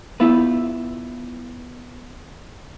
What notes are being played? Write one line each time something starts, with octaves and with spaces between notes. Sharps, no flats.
B3 E4 F4 B4